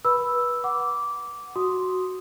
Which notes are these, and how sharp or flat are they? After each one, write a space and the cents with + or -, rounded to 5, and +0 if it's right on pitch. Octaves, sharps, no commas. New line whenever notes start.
B4 -25 B5 +0 E6 +0
F#5 +0 D6 -10
F#4 +0 C6 -5 D#6 +0